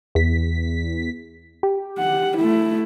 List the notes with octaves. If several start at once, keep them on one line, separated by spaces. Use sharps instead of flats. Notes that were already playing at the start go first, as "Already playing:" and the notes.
E2 B6
G4
F#5
A3 E4